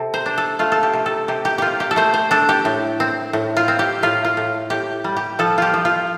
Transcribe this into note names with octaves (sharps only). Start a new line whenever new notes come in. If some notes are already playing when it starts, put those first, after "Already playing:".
Already playing: C3 A4
C5
D4
A4
A3 F4
A4
G4
C3
A4
C3 G4
G4
C3 F4 G4
G4
A4
A3 C5
C5
D4 A4
G4
A2
C4
A2
F4
C4
G4
A2 F4
F4
A2
A2 G4
G3
G4
F3 A4
F4 G4
F3
F4